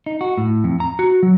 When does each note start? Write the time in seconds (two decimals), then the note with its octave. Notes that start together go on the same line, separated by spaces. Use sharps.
0.06 D#4
0.21 F#4
0.38 A2
0.64 F2
0.80 A#5
0.99 F#4
1.23 F#3